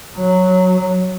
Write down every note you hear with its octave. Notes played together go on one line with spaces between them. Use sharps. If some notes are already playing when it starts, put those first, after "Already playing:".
F#3